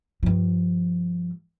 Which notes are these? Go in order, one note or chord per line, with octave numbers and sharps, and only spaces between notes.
G2 F3